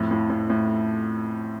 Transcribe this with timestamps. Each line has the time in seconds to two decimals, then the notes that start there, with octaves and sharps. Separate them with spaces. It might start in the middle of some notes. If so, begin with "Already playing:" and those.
Already playing: F2 A2
0.11 A2
0.30 A2
0.50 A2